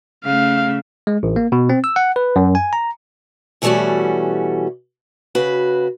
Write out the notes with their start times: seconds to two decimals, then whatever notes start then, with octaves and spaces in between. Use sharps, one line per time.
0.24 C#3 A3 F5
1.07 G#3
1.23 A1
1.36 A#3
1.52 B2
1.69 C4
1.84 E6
1.96 F#5
2.16 B4
2.36 F#2
2.55 G#5
2.73 A#5
3.62 B2 E3 G3 A3 C#4 F#4
5.35 C#3 F#4 B4